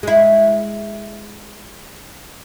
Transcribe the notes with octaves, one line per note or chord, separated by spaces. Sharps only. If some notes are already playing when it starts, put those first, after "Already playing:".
G#3 E4